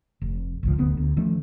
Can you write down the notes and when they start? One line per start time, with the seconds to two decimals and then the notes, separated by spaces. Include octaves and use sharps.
0.22 F1
0.63 G#1 C#2 F3
0.78 D#1 D2 B3
0.97 D2
1.16 D#3 F3 A3 C#4